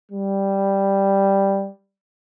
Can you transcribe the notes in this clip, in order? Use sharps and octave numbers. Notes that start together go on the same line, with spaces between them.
G3